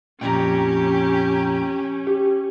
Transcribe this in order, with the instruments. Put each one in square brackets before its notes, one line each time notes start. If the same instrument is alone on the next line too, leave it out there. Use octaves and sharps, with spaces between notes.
[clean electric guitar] F2 A#2 [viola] C#4 [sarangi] G4 [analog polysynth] G5 A#5
[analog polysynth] G4